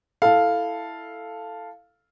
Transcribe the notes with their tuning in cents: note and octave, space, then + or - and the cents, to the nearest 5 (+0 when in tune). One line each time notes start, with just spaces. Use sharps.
E4 +0 A4 +0 F5 +0